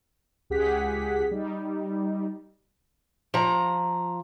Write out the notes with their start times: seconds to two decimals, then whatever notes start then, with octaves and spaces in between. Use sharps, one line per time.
0.50 C#2 G4 G#4 F#5 B6
1.31 G3 D#4
3.34 F3 A#5